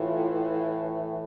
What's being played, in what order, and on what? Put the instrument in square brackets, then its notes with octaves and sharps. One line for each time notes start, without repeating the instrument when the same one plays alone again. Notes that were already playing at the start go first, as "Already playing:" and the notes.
Already playing: [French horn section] A2 E3 F4